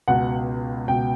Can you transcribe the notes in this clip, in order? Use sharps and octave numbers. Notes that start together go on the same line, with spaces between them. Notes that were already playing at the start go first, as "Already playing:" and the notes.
C#2 B2 F#5
C#2 B2 G5